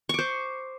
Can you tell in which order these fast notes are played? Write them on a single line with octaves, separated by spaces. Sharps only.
C#6 D6 C5